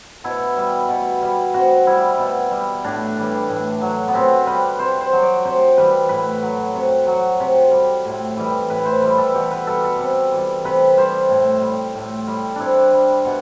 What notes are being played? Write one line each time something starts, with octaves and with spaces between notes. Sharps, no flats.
B2 E4
G3
B2
G3
C3 F#4
G3 E4
B2
G3
A2 D4
E3 G3
A2
F#3
B3
C3 C4
G3 B4
C3 C5
C5
F#3
D5
C3 C5
E3 G3 B4
A2 B4
F#3
C3
F#3
C3
G3
A2
E3 G3
A2 B4
C5
E3 G3 B4
A4
B2 G4
B4
G3 A4
A4
C3
E3 G3
C3 B4
G3 C5
A2
G3
A2
G3
C3 D4 E4
G3
B2